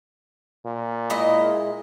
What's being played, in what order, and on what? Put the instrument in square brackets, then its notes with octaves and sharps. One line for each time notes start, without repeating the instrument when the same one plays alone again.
[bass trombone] A#2
[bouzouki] G#3 E4 D#5